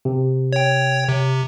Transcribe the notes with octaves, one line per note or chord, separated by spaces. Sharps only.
C3
C#5 G5
C3